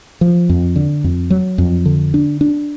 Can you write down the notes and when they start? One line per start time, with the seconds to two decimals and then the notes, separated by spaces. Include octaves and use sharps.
0.21 F3
0.49 F2
0.76 D3
1.04 F2
1.30 F#3
1.58 F2
1.85 D3
2.14 D4
2.41 D4